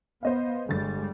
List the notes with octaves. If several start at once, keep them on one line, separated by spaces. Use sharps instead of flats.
B3 C5 D#5 F5
G1 G3 G#3 A6